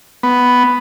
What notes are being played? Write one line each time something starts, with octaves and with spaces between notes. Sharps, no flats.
B3